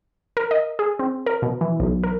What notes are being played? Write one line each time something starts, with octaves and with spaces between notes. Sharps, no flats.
A#4
D#5
G#4
C4
A#4
B2
E3
B1
A#4